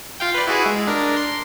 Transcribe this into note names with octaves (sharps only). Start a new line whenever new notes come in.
F4 F5 G5
B4 D5
E4 F#4 G#4
G#3
D4 A#4
C6